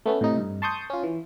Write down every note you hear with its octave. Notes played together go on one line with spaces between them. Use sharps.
A3 B3 C#4
A2 C3 D#4
G2
A5 C6 C#6 D#6 G6
C#4 F4
E3